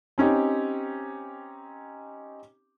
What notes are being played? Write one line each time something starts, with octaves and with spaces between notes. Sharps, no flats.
C4 C#4 D#4 G4